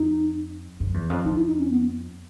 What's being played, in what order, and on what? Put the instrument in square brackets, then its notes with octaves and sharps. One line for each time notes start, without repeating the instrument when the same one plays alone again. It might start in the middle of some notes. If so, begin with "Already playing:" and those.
Already playing: [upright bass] F2 [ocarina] D#4
[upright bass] F#2
E2
F2
[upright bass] F2 [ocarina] D#4
[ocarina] E4
D#4
C#4
B3